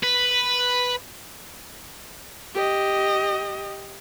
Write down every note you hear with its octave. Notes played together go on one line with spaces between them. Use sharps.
B4
G4 D#5